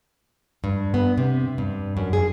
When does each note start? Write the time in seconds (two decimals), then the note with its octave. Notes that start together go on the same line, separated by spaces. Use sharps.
0.64 G2
0.94 B3
1.18 C3
1.58 G2
1.97 F#2
2.13 G#4